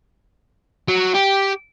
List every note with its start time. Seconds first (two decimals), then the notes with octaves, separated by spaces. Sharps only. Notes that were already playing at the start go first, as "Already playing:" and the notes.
0.88 F#3
1.14 G4